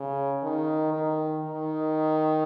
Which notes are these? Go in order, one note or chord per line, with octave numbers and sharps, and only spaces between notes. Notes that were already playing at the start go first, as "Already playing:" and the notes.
Already playing: C#3
D#3
D#3
D#3